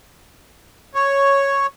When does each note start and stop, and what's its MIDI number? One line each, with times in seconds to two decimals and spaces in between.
0.95 1.67 73